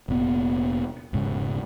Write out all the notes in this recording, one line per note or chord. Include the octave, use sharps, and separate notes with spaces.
F1 A#2 B3
E1 G#2 C#3